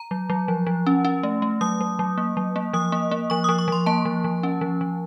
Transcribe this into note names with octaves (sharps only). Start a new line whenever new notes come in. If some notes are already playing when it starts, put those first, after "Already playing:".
Already playing: A#5
F#3
F#3
F3
F3
C#4
C#4
A3
A3
F#3 D#6
F#3
F#3
A#3
F#3
A#3
F3 D#6
A#3
A#3
F3 C#6
F3 D#6
C#6
F3 C6
A#3 A5
F3
F3
C#4
F3
F3